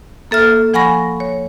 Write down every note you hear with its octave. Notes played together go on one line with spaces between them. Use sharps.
A#3 A4 E5 F6
F3 F#5 G#5 B5 C#6 A#6
C#5